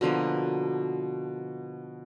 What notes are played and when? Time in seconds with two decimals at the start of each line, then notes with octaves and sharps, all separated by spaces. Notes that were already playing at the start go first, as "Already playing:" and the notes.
0.01 B2 D3 F3 A#3